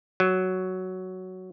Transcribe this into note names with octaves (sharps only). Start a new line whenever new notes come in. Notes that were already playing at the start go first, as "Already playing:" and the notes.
F#3